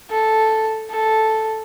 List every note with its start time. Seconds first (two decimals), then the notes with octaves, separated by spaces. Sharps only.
0.10 A4
0.91 A4